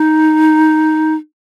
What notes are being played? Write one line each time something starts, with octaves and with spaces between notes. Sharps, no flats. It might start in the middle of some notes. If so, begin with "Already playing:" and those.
Already playing: D#4